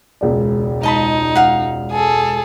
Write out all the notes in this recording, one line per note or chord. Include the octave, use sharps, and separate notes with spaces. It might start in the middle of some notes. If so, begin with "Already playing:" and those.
E1 C#2 D5
D#4 D#5 A5 B5
F5 F#5
G#4 A4